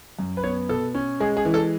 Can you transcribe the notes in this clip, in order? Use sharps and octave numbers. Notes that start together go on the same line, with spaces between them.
F#2
B4
B3 C#5
B2 A4
C#4
G#3 G#4
G#4
E3
A4